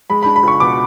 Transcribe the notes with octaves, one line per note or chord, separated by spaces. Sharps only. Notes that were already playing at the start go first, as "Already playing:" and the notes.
G#3 B5
D4 B5
B5
C#2 C#6
B2 D6